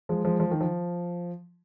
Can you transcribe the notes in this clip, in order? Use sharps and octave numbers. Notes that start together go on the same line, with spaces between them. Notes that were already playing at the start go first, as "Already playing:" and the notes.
F3 G#3
F3 G#3
F3
D#3
F3